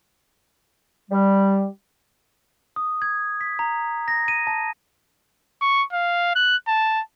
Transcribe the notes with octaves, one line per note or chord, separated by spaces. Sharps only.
G3
D#6
G#6
B6
A#5
A#6
D#7
A5
C#6
F5
F#6
A5